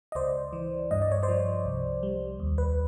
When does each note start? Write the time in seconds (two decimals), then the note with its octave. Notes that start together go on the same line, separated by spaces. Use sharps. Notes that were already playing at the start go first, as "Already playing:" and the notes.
0.12 D#5
0.15 C#2 C5 D5
0.53 E3
0.91 G2 D#5
1.02 D5
1.12 C#5
1.23 C5 D5
1.28 F3
1.65 C2
2.03 G3
2.40 D#2
2.58 B4